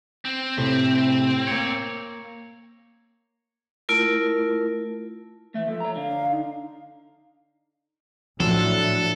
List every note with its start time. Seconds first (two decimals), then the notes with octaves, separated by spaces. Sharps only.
0.25 C4
0.57 A2 C3 A3
1.47 A#3 C#5
3.89 A3 E4 F4 A#4
5.54 E3 A3 E5
5.68 F3 A4
5.80 C#5 A#5
5.96 D3 F5
6.31 D#4
8.40 A2 F3 F#3 D4 A4